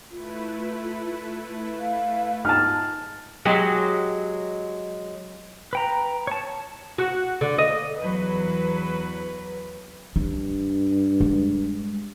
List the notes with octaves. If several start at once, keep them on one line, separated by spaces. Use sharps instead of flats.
A3 E4 F4 B4
F5
G#2 F4 A5 F6 F#6
F#3 G#3 G4
B4 G5 A#5
C#5 A5
F#4
D3
D#5
E2 F#3 B4
G2 D4
G#3